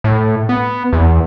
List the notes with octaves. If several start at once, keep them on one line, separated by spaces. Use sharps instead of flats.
A2
B3
E2